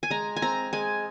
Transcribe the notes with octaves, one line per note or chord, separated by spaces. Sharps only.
G#5
G#3 A#5
G#5
C4 A#5
G#3 G#5